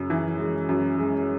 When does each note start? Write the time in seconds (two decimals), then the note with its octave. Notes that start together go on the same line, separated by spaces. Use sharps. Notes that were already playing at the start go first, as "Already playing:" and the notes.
Already playing: F#2 C#3
0.10 E3
0.40 G#3
0.69 F#2
0.98 G#3